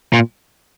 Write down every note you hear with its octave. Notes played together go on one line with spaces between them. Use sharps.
A#2